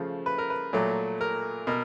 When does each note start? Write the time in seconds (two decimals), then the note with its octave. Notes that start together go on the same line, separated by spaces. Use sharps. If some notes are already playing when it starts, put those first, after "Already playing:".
Already playing: C#3 F3 A3
0.26 B4
0.38 A#4
0.50 B4
0.73 A#2 F#3 A3
1.21 A#4
1.67 B2 A#4